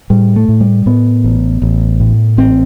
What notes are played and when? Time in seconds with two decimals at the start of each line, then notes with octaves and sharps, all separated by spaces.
0.10 A2 G3
0.36 A3
0.49 A2
0.61 G3
0.86 A2 B3
1.24 A1
1.62 A1
2.00 A2
2.38 A1 C4